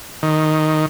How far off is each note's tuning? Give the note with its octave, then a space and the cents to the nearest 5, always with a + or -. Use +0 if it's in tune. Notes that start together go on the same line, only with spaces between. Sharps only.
D#3 +0